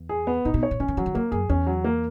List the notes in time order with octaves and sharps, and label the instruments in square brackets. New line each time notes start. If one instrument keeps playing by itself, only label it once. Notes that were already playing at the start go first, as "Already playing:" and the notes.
Already playing: [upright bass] E2
[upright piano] G#4
B3
[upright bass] A#2 [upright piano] D#4
[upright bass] B2
[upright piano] C#5
[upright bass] B2
[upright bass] C#3 [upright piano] C#4
[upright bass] D#3
[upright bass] E3 [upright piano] F#3
[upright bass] D#3
[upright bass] C#3 [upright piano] A#3
[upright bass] F#2 [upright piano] G#4
[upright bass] E2 [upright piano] C#4
[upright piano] F#3
A#3